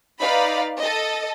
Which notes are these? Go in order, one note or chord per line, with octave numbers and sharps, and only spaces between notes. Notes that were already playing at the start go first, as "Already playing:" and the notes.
D#4 B4 D5 F5 B5
A4 D#5